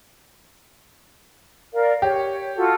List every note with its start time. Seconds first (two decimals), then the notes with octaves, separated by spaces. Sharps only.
1.73 A#4 D5 F5
2.02 G4 C#5
2.57 F4 F#4 A4